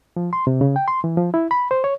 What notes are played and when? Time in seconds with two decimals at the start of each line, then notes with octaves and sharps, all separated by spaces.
0.16 F3
0.33 C6
0.47 C3
0.61 C#3
0.76 G5
0.88 C6
1.04 E3
1.17 F3
1.34 E4
1.51 B5
1.71 C5
1.84 C#5